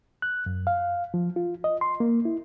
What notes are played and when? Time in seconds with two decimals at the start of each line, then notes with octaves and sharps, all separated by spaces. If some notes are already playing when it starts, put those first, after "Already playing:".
0.22 F#6
0.46 F#2
0.67 F5
1.14 F3
1.36 F4
1.64 D#5
1.81 C6
2.00 A#3
2.25 E4